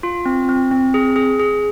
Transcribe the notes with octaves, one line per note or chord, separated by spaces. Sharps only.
F4
C4
C4
C4
G#4
G#4
G#4